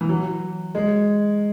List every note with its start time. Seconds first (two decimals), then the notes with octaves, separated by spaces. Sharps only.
0.01 E3
0.09 F#3
0.75 G#3